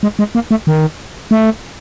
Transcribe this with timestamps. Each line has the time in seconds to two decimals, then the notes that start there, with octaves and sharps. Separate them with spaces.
0.03 G#3
0.19 G#3
0.35 A#3
0.51 A3
0.67 D#3
1.31 A3